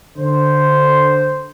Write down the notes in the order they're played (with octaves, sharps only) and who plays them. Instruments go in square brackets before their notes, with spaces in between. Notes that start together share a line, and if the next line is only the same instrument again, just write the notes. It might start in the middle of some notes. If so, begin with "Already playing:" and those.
[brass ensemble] D3 C5